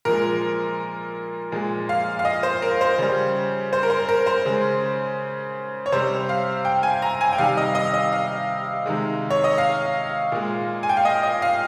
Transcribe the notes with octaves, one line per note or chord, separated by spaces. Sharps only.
A#2 F3 G#3 A#4
A#2 F3 G#3
F5
F5
D#5
C5
A#4
C5
C#3 G3
C5
A#4
C5
A#4
C5
C#3 G#3
C#5
C3 G3 C5
F5
G5
G#5
A#5
G#5
G5
C3 D#3 G3 F5
D#5
D#5
D#5
F5
C3 D#3 G#3
C#5
D#5
F5
A#2 G#3
G#5
G5
F5
D#5
D#5
F5